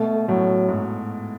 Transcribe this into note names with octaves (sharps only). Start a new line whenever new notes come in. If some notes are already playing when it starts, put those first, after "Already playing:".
Already playing: B2 A3
A2 F#3
G#2